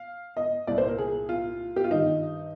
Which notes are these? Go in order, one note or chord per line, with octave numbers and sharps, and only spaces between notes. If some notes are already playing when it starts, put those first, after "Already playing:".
Already playing: F5
D#5
C2 A#2 D5
C5
A#4
G#4
F4
G4
F4
G2 D#3 D#4